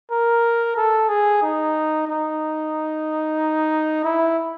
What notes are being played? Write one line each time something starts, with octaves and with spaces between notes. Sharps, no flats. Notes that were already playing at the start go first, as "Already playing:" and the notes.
A#4
A4
G#4
D#4
D#4
E4